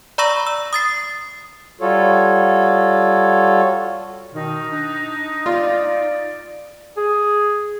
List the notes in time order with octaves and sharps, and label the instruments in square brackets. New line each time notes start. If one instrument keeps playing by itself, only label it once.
[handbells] D5 A#5 B5 C#6 E6 A#6
E6
D#6 A6 C7
[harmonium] G3 F4 F#4 A4 C#5
[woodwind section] B2 D#3 [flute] D#4
[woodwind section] D4
[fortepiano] F4 [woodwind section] D5
[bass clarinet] G#4